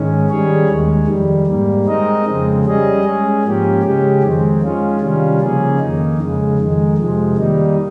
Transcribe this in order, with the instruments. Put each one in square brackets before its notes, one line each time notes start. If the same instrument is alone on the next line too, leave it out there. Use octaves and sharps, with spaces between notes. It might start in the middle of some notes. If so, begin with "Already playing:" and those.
Already playing: [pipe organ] G#2 D#3 G#3 C#4
D#3 G3 C#4 G#4 C#5
D#2 D#3 G#3
F2 D#3 G3
G#2 G3 A#3
G#3 C4 D#4 A#4 D#5
F2 C#3 G#3 C4
G3 C#4 G#4 D#5
G#3 C#4 G#4
G#2 F3 A#3 C#4 G4
C#3 G#3 C#4 G4
F2 D#3 G#3 C4
G#3 C#4 F4
C3 D#3 G3 C#4 F4
C#3 F3 A#3 C#4 G#4
F2 D#3 A#3 D#4
F2 C#3 G#3
F2 D#3 G#3
F2 C3 F3 G#3
D#3 G3 A#3 D#4